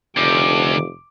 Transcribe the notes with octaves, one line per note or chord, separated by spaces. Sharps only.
F1 D2 D6